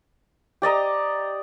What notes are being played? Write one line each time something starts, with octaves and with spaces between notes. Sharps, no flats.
G4 D5 D#5 A#5